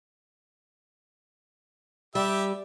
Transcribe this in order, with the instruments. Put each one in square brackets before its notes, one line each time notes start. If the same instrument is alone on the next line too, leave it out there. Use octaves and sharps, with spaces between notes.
[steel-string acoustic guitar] G3 [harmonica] G4 E5